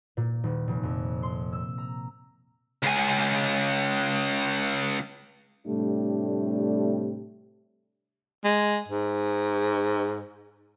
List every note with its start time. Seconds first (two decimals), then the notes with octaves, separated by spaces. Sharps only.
0.17 A#2
0.43 D#1
0.67 F1
0.83 F2
1.23 C6
1.52 E6
1.78 A#5
2.83 C#2 G#5
5.67 A2 C3 G3 A3 D4 G4
8.44 G#3
8.88 G#2